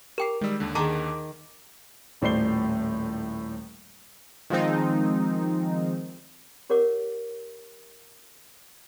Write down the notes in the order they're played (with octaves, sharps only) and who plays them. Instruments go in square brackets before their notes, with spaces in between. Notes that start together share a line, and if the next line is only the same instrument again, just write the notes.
[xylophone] G4 G5 C7 [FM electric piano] A#4 D6
[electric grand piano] D#3 G3 [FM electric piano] G#3 E6
[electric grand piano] D#2 D3
[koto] D#3 [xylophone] G#4 A5 [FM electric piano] D6
[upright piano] D#1 A2 C5 D5 C7 G7
[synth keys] D#3 F3 G#3 C4 D#4
[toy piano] G4 A#4 C#5 F#5 D6